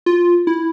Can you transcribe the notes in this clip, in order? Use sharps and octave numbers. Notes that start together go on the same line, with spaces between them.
F4
E4